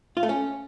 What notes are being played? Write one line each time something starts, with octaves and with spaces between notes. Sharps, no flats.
F4
A3
C#4